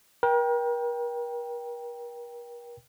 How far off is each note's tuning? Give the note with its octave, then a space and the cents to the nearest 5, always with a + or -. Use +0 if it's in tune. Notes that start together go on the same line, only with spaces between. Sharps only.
A#4 +40 G5 +5